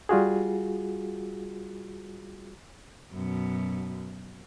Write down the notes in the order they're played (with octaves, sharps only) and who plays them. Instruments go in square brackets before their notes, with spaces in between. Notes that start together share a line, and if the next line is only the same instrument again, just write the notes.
[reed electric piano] G3 F4 F#4 G#4
[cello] F#2 B2